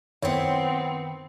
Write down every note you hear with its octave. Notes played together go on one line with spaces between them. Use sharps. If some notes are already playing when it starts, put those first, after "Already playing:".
F#2 D#3 B3 C4 E4 C#5